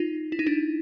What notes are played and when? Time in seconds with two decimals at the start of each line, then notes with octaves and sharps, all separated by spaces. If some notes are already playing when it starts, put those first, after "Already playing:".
Already playing: D#4 F4
0.32 E4
0.39 D#4
0.46 D4 E4